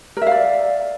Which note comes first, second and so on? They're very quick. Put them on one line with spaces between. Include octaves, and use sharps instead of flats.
A#4 E5 F5 D5